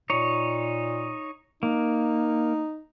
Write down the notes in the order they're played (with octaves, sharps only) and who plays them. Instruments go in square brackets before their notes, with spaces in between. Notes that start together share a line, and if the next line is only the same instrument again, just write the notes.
[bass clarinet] A#2 [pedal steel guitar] D#4 C#5
[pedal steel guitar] A#3 [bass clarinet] D#4